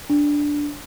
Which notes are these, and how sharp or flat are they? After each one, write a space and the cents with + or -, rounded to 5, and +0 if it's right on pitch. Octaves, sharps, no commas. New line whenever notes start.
D4 -5